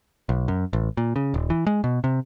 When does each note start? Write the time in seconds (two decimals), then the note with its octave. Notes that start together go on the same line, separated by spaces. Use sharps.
0.29 B1
0.48 F#2
0.73 A1
0.97 A#2
1.16 C#3
1.34 D#1
1.50 E3
1.67 G#3
1.84 B2
2.04 C3